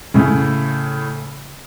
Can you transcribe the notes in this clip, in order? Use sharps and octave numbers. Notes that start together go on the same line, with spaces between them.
A2 C#3